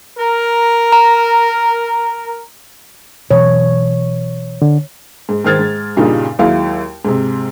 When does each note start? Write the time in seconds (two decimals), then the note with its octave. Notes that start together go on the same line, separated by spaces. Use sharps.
0.18 A#4
0.93 A#5
3.31 B2 E3 F#3 C#5
4.62 D3
5.29 G#2
5.45 G#2 D#3 C5 F6 G#6 A6
5.59 G#2
5.97 G2 A#2 C#3 G3 D#4
6.39 D#2 F#3 G#3 E4 F5
7.05 G#2 C3